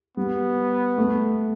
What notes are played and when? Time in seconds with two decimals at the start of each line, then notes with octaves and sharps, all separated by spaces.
0.17 G3 B3
0.98 A3